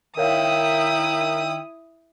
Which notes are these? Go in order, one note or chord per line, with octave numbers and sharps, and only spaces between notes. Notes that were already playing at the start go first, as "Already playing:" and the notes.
D#3 E4 A#4 C#5 E5 F5 G5 D#6